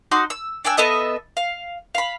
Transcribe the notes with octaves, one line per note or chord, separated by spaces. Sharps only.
D#4 F#4 C6 D6
E6
D4 G5 G#5 E6
B3 A4 D#5 E5
F5
F5 B5